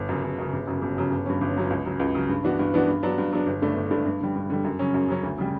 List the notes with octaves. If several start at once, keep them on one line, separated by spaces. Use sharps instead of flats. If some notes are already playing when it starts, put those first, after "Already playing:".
Already playing: G1
F#2 C#3
G1
F#2 C#3
G1
F#2 C#3 F#3
G1
F#2 C#3 F#3
G1
G2 F#3 C#4
G1
G2 F#3 C#4
C#2
C#3 F#3
C#2
C#3 F#3
G2
E3 B3 D4 F#4
G2
E3 B3 D4 F#4
G2
F#3 B3 D4
G2
F#3 B3 D4
G1
G2 D3 A3 D4
G1
G2 D3 A3 D4
G2
D3 G3
G2
D3 G3
F#2
C#3 F#3 C#4
F#2
C#3 F#3 C#4
D2
C#3 G3